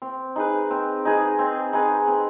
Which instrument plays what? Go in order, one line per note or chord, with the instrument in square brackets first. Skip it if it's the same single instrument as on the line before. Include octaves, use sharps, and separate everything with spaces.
[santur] C4
D#4 G#4 B4
C4
D#4 G#4 B4
C4
D#4 G#4 B4
C4